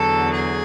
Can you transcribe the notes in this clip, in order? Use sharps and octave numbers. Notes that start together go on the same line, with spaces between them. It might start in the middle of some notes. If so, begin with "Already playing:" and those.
Already playing: E2 D3 F#3 A4
G#4